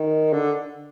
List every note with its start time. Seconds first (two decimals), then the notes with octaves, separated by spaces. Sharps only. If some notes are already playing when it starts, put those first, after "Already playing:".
Already playing: D#3
0.33 D3